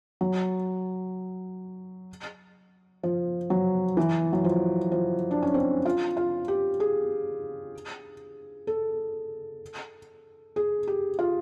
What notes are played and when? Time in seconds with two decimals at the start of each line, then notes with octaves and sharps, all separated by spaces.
0.21 F#3
3.03 F3
3.50 F#3
3.97 E3
4.33 F#3
4.44 F3
4.92 F3
5.31 D4
5.42 C#4
5.54 C4
5.85 F4
6.17 F4
6.48 G4
6.80 G#4
8.67 A4
10.56 G#4
10.88 G4
11.19 F4